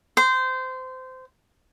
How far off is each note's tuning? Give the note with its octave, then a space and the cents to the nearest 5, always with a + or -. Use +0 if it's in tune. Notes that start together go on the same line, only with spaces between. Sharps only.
C5 -20